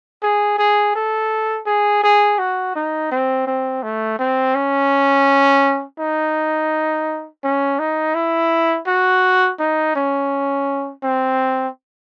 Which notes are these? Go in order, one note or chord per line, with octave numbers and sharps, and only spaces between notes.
G#4
G#4
A4
G#4
G#4
F#4
D#4
C4
C4
A3
C4
C#4
D#4
C#4
D#4
E4
F#4
D#4
C#4
C4